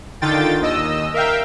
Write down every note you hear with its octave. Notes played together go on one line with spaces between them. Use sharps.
D3 D#3 F4 G5 A6
D#2 D#5 E6
A#4 E5 F5 G5